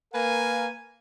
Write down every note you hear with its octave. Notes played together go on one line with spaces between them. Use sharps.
A#3 A#4 B4 F5 G#5